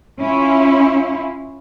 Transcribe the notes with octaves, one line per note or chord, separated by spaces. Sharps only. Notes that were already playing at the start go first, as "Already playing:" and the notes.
C#4 E4 F4